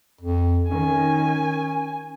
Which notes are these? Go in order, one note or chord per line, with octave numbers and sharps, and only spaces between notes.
F2
D#3 C#4 G#5